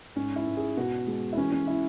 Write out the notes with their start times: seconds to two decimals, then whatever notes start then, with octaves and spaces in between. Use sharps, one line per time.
0.16 G#2 C#4
0.36 E4
0.46 G#2
0.57 G#4
0.77 B2 F#4
1.07 G#3
1.33 E4
1.37 E3 C#4
1.52 C#4
1.67 E3 E4